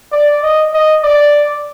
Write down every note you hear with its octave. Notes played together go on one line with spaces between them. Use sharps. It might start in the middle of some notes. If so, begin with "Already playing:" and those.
D5
D#5
D#5
D5